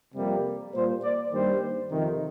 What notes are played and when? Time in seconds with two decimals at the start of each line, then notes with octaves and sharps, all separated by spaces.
0.14 F2 C3 G3 A#3
0.72 A#2 G3 A#3 C5
1.01 D5
1.31 G2 D#3 G3 A#3 C5
1.89 F2 C3 D#3